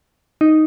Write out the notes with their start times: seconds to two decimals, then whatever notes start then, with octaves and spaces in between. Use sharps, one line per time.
0.41 D#4